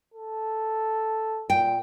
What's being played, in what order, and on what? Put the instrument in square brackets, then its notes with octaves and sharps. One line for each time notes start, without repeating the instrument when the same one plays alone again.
[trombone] A4
[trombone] A#2 [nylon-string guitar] G5